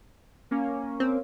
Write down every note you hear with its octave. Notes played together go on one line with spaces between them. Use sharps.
A#3 C#4
C4